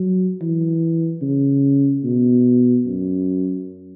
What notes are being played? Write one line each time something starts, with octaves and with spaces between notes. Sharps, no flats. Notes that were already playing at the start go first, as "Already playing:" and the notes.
Already playing: F#3
E3
C#3
B2
F#2